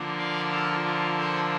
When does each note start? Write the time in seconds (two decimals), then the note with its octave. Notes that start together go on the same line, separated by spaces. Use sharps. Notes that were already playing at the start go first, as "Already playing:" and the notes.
Already playing: D3 F3 A#3 D4
0.19 D5 F5
0.52 F4 A4
0.85 F4
1.17 A4 C5